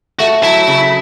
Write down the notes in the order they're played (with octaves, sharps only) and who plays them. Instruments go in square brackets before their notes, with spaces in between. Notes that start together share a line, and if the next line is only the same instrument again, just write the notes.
[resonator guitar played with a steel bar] A3 [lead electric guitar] F#4
[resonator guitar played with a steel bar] F#3 [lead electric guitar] E4
[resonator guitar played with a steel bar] C#3